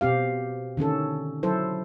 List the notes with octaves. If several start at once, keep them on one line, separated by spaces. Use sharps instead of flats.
B2 C4 G4 F5
D3 D#3 C#4 A4
F#3 E4 A4 C5